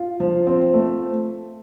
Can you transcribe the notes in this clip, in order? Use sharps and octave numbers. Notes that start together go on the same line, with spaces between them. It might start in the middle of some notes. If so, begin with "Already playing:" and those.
Already playing: F4
F3
C4
A3